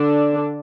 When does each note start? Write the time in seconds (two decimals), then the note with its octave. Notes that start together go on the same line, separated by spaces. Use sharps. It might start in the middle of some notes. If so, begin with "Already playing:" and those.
Already playing: D3 D4